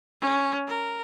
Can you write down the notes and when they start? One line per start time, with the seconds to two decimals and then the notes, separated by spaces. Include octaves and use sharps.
0.21 C#4
0.68 A#4